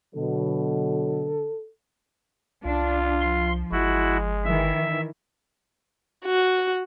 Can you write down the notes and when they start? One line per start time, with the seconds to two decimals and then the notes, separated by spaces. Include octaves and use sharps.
0.15 B2 D3 F#3 A4
2.65 C2 D4 F4
3.21 F3 C6
3.72 G1 G#3 E4 F#4
4.45 D#3 E3 E5
6.25 F#4